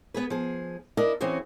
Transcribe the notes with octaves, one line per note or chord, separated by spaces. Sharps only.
B3 G#4 B4
F3 G#4
D4 E4 A#4 D5 D#5
E3 C4 C#4 F#4 G#4